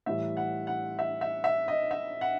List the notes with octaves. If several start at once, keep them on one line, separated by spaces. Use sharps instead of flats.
A2 E3 G3 E5
F#5
F#5
E5
E5
E5
D#5
E5
F#5